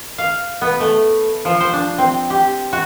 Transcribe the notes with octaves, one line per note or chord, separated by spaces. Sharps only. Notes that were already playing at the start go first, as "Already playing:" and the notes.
F5
B3
A3
F3
C5
D4
C4
G4
F#4